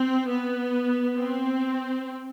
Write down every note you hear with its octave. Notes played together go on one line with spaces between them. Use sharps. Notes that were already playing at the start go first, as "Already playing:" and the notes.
Already playing: C4
B3
C4